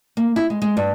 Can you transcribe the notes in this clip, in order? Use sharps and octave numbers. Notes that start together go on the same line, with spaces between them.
A#3
E4
G#3
G#3
G2